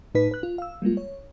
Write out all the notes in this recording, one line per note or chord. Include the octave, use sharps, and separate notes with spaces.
A2 D#4 B4 B6
B4 F#6
F4
F5 E6
G3 G#3 A#3 F4
C#5